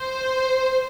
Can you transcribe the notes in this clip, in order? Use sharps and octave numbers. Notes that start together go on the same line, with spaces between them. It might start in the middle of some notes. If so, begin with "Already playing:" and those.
Already playing: C5